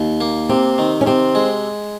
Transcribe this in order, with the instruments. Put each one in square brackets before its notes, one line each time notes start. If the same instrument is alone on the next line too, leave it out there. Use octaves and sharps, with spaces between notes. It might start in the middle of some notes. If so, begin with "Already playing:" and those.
Already playing: [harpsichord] D#2
A#3
[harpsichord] C3 [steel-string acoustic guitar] C4
[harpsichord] D#3
[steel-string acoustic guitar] C#4
[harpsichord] C3 [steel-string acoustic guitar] C4
[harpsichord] G#3